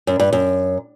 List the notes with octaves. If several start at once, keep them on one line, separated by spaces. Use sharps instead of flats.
F#2
G2
F#2